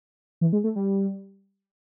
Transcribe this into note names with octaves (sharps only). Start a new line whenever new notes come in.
E3
G#3
A3
G3